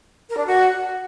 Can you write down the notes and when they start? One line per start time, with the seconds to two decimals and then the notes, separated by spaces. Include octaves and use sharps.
0.29 A#4
0.37 D4
0.46 F#4